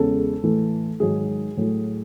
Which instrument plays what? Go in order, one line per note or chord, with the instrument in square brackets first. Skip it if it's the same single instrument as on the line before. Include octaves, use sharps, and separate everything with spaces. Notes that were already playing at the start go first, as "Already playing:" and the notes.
Already playing: [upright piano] E2 C#3 G#3 A4
A2 E3 A3
G#2 D#3 F#3 G#4
A2 F#3 A3